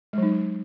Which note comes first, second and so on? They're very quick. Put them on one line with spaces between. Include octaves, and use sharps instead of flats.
G#3 F#3 D#4